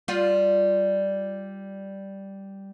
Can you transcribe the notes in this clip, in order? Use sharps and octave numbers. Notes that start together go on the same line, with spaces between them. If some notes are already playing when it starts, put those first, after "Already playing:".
G3 F4